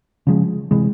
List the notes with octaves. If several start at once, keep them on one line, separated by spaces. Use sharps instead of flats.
C#3 F3 G#3
C3 E3 G#3